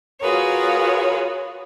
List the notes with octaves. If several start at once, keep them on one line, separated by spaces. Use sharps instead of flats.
F4 F#4 G#4 A#4 B4 C#5